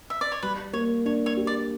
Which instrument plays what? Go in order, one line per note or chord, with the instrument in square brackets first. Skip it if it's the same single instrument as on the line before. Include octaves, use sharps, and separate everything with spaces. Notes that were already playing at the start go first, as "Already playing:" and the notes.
[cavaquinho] E5
D5
C#5
[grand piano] G3 [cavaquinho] B4
[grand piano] A#3 [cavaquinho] C#5
[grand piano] D4 [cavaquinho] C#5
[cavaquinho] C#5
[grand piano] G4
[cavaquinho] D5